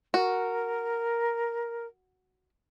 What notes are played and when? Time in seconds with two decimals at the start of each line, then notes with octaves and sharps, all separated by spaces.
0.14 F#4 A#4